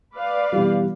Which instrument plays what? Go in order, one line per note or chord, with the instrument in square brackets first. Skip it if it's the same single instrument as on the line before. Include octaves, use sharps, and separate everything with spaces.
[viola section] B4 D5 F5
[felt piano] B2 E3 G3 [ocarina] G4